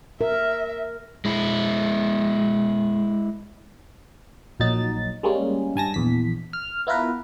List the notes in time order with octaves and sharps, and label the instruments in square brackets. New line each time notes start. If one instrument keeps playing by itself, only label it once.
[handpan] A#4 [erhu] E5
[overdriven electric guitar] G#3 E4
[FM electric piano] A#1 A#2 F#3 D#4 A6
G3 G#3 A#3 C#4
G2 G#5 A5 A#6
A#1 E2 B6
F6
B3 E4 F4 A#4 B4